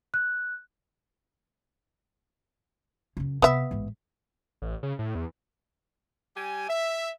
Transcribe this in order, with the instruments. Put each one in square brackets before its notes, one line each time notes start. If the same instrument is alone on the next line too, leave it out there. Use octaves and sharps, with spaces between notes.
[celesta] F#6
[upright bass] F#2 C#3
[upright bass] C3 [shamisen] B3 E5
[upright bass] A1 G#2
[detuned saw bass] A1
C#3
A2
E2
[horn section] G3 G4 G#5
E5